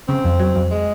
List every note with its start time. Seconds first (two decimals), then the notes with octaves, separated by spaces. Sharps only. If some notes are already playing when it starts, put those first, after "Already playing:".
0.08 C#3 C4
0.25 F2
0.40 F#3
0.56 F2
0.71 G#3